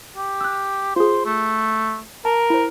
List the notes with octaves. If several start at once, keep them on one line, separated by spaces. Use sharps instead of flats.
G4
E6 F#6
F4 G#4 C5
A3
A#4 A5
E4 C5